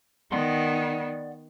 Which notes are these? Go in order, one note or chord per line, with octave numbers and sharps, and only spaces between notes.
D#3 B3 D5 F#5 C6